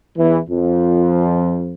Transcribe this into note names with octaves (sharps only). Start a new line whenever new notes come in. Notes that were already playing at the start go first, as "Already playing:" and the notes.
E2 E3
F2 F3